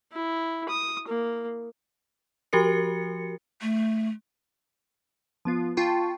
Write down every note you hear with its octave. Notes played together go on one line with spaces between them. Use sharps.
E4
D#6
A#3
F3 F#4 G4 A#4 C#7
A3
F3 B3 F4
F4 G5 A5 C6 C#6